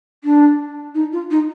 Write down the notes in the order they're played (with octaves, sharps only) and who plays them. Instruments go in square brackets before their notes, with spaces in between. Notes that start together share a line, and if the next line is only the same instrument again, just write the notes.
[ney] D4
D#4
F4
D#4